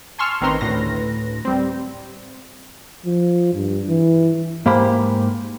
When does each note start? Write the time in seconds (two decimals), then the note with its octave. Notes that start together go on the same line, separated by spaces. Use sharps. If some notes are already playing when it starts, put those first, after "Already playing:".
0.18 G#5 A5 C6 C#6 E6 F6
0.41 A1 D#3 C4 B4 A#5 C6
0.61 D2 A2 B4 A#6
1.45 G3 C4
3.05 F3
3.54 G2
3.89 E3
4.66 G#2 A#3 G4 C5 B5